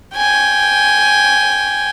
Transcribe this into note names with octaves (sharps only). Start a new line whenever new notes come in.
G5 G#5